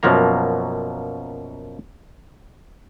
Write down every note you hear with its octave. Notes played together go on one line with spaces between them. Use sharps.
F#2 B2 F3 F#3 A#3 A#5